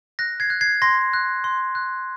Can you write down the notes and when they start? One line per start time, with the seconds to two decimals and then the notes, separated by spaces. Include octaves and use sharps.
0.19 F#6 A#6
0.40 G#6 C7
0.50 F#6
0.61 G#6 C7
0.82 C6 A#6
1.13 F#6
1.44 C6
1.75 F#6